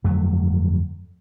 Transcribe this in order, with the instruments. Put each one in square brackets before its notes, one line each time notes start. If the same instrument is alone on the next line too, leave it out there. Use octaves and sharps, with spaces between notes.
[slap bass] G1 F2 F#3 A3